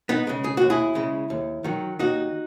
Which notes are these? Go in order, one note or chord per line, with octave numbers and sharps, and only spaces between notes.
B3 D#4
C#3 G#3
G#4
D#2 F#4
E4 G#4
C#3 G#3
D#2
D#3 F#3
D#2 D#4 F#4